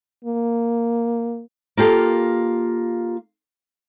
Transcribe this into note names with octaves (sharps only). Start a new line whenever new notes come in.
A#3
A#3 F4 G4 A4